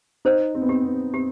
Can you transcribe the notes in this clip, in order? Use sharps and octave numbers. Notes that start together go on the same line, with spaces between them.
D#4 C5
C4
B3
C4 G4
B3
C4 G4